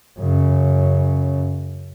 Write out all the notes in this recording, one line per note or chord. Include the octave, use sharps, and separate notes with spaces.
F#2 C#3